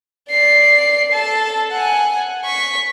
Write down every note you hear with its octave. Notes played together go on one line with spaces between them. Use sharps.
D5 C7
A4 A5
F#5 G#5
C#6 B6